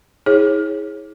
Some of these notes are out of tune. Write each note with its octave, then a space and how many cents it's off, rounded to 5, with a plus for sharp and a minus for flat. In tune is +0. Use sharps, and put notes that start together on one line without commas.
E4 -35 G#4 +0 C#5 -30